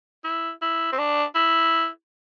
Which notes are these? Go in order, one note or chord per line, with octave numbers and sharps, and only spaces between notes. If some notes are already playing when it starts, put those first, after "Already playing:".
E4
E4
C4
D4
E4